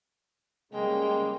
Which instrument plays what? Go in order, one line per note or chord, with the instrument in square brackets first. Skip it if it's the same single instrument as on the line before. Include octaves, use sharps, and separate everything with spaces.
[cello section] C#3 G3 [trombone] G#3 [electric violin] A#3 G5